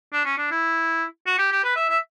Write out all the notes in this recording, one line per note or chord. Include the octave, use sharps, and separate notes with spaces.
D4
C#4
D4
E4
F#4
G4
G4
B4
E5
E5